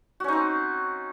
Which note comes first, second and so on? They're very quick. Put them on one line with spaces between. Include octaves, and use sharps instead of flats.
F#4 C#4 D#4 C4